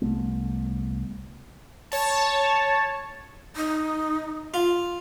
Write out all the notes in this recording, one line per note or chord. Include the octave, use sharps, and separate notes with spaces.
C2 A3 B3
C#5 A5
D#4
F4